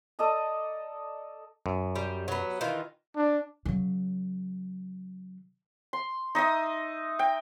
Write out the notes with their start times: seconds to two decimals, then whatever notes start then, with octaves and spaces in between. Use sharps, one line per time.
0.19 A4 D5 D#5 A#5
1.66 F#2
1.96 G3
2.28 F#3 B3
2.61 D#3 E3 F4
3.16 D4
3.65 C#3 F#3
5.93 C6
6.35 D#4 D#5 E5 D#6
7.19 G5